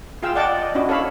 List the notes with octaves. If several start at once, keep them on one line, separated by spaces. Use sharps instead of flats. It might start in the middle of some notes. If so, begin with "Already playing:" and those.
F4 G#4 F5 G5 E6
D5 D#5 F#5 G5 A5 D6
D5
D#5
C#4 D4 E4 F#4 D#5
A4 C#5 F5 A5 B5